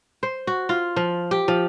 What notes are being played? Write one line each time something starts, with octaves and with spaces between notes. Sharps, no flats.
C5
F#4
F4
F3
G4
F3